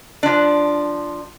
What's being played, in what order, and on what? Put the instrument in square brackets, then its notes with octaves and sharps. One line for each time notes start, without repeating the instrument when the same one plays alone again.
[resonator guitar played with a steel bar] F3 D4